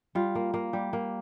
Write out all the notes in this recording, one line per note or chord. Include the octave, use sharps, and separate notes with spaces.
G3 F4
A#3
A#3
G3
A#3